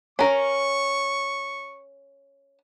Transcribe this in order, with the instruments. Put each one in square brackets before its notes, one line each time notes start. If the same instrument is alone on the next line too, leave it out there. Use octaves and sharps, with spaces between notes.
[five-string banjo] C#4 A#4 [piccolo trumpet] C#6